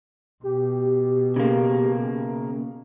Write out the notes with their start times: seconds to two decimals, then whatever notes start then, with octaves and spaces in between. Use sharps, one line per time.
0.44 B2 G4
1.36 C#3 A#3